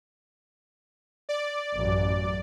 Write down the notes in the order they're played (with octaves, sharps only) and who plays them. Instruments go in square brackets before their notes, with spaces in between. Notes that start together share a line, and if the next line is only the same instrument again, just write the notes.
[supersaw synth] D5
[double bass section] A1 F#2 F#3